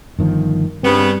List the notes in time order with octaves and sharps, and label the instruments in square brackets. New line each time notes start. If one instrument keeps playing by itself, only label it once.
[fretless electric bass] G1 D#3 F3
[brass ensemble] G2 [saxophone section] C#3 B3 [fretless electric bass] C4